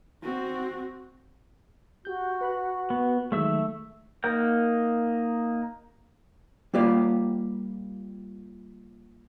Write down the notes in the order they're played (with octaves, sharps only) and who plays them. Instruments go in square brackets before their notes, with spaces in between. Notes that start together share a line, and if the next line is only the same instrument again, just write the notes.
[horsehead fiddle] C4 F#4
[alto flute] F#4 [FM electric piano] G4 G6
[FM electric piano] B4 B5 F#6
[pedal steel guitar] B3
[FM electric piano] D#3 F#3 G#3 [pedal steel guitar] A3 E5 E6
[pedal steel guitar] A#3 D#4 A#4 F#5 G6
[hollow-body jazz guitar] G3 A#3 F4 G4 D5 F5